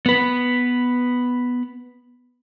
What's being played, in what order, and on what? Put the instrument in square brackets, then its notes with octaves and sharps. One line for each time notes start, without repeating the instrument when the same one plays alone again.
[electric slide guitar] B3 B4